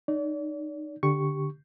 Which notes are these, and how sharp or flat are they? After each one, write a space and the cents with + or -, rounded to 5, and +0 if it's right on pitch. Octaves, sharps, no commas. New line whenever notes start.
D#4 -25 D5 -40
D3 +0 G4 +0 C#6 +0